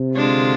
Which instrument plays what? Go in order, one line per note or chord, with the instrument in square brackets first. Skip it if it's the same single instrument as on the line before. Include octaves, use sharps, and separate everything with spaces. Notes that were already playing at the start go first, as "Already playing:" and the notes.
Already playing: [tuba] C3
[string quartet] D3 G#3 D4 F4